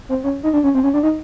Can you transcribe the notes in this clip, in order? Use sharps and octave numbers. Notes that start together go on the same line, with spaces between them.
C4
C#4
D#4
D4
C#4
C4
C#4
D4
D#4